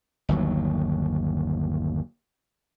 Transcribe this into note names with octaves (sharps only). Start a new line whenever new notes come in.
G1 D#2 F#3